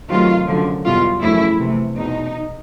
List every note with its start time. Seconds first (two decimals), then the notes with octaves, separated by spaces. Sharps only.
0.09 C3 D#3 F#3 A3 F4
0.46 F#2 D3 F3
0.84 E2 B2 G3 F4
1.21 F#2 C#3 F3 A3 E4
1.59 C3 E3 A3
1.96 E2 B2 G#3 D#4